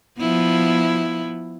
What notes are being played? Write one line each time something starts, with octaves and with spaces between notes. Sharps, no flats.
F3 B3 E4